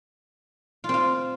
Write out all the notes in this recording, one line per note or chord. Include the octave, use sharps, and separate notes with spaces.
F4
C4
F4